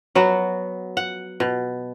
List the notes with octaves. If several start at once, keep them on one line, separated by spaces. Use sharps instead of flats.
F#3 B3 F#4
F#5
B2